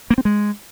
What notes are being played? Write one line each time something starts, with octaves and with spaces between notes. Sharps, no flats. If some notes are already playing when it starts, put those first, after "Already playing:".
A#3
C4
G#3